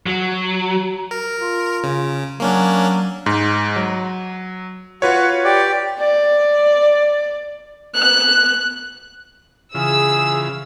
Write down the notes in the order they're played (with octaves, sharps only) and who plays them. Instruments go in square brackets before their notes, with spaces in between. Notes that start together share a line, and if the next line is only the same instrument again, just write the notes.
[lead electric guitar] F#3
[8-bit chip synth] A#4
[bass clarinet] F4
[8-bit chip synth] C#3
[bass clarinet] F#3 [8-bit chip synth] A#3 C#4 D4
[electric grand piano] G#2
F#3
[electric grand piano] F4 B4 C#5 [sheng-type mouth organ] F#4 C#6
[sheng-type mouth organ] G4 D5
[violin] D5
F#6
[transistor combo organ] C#3 E3 F4 [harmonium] G#4 [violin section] E6